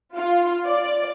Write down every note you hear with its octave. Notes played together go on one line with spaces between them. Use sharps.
F4
D5